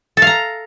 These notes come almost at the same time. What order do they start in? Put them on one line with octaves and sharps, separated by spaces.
A4 F5 A#5